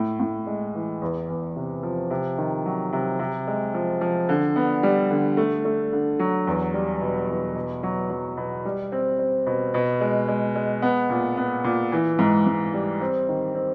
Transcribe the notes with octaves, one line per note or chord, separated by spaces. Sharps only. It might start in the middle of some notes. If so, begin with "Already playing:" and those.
Already playing: A2
A2
G#3
E3
E2
E2
C3
F3
C3
D#3
F#3
C3
C3
G#3
F3
F3
D3
B3
G3
D3
A3
A3
D3
F#3
E2
G3
B2
E2
B2
F#3
F#3
B2
G3
C4
C4
B2
B2
G#3
G#3
G#3
B3
A#2
B3
A#2
E3
G#2
G#2
G3
C4
D#3
C4